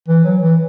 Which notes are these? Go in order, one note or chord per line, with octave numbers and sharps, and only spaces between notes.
E3
F#3
E3